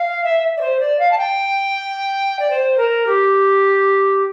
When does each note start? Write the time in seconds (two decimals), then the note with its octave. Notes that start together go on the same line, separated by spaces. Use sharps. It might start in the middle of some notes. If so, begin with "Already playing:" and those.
Already playing: F5
0.24 E5
0.57 D5
0.61 C5
0.80 D5
0.99 F5
1.11 A5
1.18 G5
2.39 D5
2.50 C5
2.78 A#4
3.06 G4